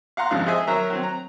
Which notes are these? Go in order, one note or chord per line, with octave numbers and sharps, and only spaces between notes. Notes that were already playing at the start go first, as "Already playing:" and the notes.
F5 F#5 A#5 C6
G#1 C#3 F3 D#4 F5 F#6
G#4 C5 D#5 E5 G#5
F#3 F#4 A#4 E5 A#5
F#3 C4
A#5